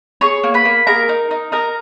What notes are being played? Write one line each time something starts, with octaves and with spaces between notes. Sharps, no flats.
G#4 C#5 C#6
A#3
B4 B5
A#3
G#4 A#4 A#5
D#4
D#4
D#4 A#4 A#5